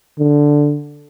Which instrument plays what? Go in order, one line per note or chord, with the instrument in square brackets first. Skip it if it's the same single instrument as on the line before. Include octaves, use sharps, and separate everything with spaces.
[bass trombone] D3